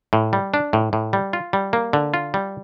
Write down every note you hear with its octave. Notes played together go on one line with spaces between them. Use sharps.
A2
G3
D4
A2
A2
G3
F4
G3
A#3
D3
F4
G3